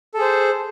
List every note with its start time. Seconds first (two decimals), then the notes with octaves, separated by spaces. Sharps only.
0.14 A4
0.18 G#4
0.21 C5